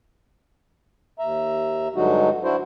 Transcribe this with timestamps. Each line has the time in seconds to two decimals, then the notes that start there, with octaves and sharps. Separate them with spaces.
1.19 D#2 E5 A#5
1.95 G2 D3 F#3 G#3 D#4 F#4
2.44 D4 E4 F#4 C5